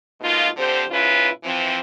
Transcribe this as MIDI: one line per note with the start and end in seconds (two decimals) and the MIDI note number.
0.21 0.48 47
0.21 0.48 56
0.21 0.48 58
0.21 0.48 63
0.21 0.48 65
0.57 0.83 50
0.57 0.83 53
0.57 0.83 60
0.57 0.83 67
0.57 0.83 72
0.90 1.28 44
0.90 1.28 47
0.90 1.28 61
0.90 1.28 64
0.90 1.28 65
0.90 1.28 71
1.44 1.78 52
1.44 1.78 53
1.44 1.78 60